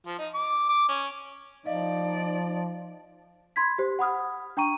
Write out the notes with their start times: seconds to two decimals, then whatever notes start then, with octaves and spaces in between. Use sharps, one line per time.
0.06 F3
0.19 D#4
0.34 D6
0.69 D6
0.88 C#4
1.66 F3 D#4 D5 D#5 F5
3.56 B5 C6 G#6 B6
3.78 G4 C5
3.99 F#5 B5 D#6 F6
4.57 D4 G5 A#5 C#6 D#7